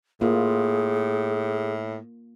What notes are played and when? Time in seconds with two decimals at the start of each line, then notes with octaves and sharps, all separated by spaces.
0.21 A2 A#3 F4 G#4